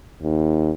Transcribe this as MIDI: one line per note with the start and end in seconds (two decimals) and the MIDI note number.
0.23 0.71 39